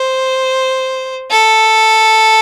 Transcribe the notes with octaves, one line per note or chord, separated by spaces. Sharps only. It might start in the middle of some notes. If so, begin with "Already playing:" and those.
Already playing: C5
A4